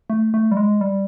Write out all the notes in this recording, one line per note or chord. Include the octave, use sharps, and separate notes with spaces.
A3
A3
G3
G#3
G3